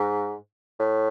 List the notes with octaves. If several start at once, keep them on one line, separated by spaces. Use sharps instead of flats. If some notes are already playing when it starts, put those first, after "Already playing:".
Already playing: G#2
A2